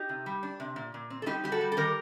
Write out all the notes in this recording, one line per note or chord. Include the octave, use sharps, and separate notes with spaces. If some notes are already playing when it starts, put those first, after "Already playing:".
Already playing: D#4 G4
C3
G3
D4
C3
A#2
A#2
C4
A4
G3 D#4 G4
G3 G4
F#4 A4
G3
A4
D#3 G4 A#4